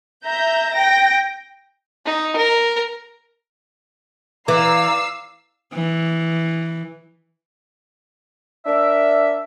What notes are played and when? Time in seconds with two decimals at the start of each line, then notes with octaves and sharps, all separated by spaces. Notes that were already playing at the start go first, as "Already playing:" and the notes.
0.25 E5 A#5 G6
0.74 G5 A#6
2.06 D#4
2.36 A#4
4.48 E3 D5 F5 A#5 E6 C7
5.74 E3
8.66 D4 A#4 E5